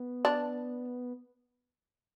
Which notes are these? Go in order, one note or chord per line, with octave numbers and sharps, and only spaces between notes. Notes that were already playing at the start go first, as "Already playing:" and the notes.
Already playing: B3
D4